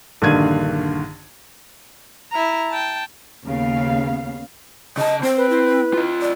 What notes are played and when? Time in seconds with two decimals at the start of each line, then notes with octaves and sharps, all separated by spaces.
0.22 A#1 G2 D3 D#3 G#6 D#7
2.32 E4 A#5
2.70 G5 A5
3.44 D#2 C#3 B3 F5
4.97 C#3 D#5 A5
5.23 C4 C5
5.37 B4
5.50 E4
5.94 F4 D#5
6.21 D5